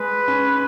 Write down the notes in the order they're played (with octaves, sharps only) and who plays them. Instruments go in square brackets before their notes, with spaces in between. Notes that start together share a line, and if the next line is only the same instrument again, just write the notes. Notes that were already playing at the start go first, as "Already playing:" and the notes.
Already playing: [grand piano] G#3 [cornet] B4
[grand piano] C#4